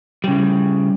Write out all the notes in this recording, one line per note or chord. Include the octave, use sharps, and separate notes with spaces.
C#3 G3